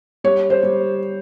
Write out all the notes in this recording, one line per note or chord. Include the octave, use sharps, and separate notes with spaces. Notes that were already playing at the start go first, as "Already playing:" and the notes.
G3 C#5
C5
G3